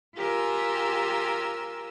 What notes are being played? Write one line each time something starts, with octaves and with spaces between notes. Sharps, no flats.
F4 G4 A#4 G#5 E6